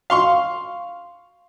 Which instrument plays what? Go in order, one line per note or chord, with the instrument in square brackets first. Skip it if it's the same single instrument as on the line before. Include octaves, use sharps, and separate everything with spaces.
[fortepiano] F5 C6 C#6